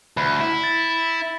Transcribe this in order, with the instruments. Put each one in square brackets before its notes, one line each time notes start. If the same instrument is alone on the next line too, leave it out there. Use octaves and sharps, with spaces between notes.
[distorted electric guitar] D2 [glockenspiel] B5
[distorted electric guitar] E4
[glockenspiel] A6